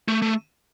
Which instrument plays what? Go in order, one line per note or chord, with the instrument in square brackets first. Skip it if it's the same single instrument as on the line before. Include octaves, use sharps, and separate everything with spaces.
[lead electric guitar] A3
A3